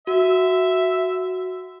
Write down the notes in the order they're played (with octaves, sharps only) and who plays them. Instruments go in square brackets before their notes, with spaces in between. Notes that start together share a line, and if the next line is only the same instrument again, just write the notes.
[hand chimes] F#4 [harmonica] E5